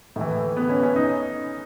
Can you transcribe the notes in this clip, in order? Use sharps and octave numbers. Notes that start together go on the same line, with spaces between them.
A2 E3
B3
C#4
C#4
D#4